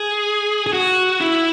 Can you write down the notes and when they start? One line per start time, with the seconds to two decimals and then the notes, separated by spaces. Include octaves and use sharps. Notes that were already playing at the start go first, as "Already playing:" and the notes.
Already playing: G#4
0.67 G#4
0.73 F#4
1.21 E4